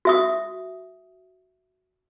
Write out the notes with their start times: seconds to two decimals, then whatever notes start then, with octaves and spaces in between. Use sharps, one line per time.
0.05 F#4 E5 D#6